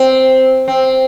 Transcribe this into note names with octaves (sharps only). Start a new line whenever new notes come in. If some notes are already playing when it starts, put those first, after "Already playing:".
Already playing: C4
C4